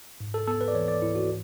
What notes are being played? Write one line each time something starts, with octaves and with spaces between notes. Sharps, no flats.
G#2
A4
B3 A4
B4
D5
E3 C#5
D5
G#2 E4
F#4